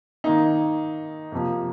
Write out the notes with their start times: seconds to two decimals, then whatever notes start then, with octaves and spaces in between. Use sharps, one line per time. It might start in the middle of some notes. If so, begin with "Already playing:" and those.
0.24 D#3 A#3 D#4
1.32 F2 C3 F3 A#3